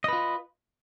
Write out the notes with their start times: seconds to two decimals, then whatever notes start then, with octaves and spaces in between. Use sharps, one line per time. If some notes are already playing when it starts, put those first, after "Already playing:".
0.04 D#5
0.08 B4
0.13 F4